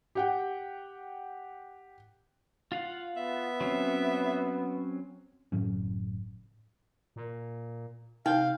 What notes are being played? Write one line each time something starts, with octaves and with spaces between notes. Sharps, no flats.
G4 F#5 G5
F4 F5 F#5
B3 E5
F#3 C4 C#4
F#1 A2 F#3 C#4
A#2
C3 D#4 F5 G5